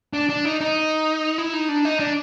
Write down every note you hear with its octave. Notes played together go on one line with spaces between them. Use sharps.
D4
D4
D#4
D#4
E4
D#4
D4
D#4
D4